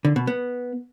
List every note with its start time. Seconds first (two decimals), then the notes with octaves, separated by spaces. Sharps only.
0.05 D3
0.16 B2
0.27 B3